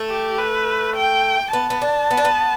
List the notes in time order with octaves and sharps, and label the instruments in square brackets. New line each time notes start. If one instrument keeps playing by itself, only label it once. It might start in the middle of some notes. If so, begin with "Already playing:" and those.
Already playing: [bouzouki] A3
[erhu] G4
B4
G5
[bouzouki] B3 [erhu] A5
[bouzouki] B3
D4
B3
D4
B3